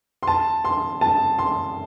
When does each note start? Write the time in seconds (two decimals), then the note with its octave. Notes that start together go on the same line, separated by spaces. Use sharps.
0.23 C6
0.27 A5
0.65 C6
1.01 A5
1.39 C6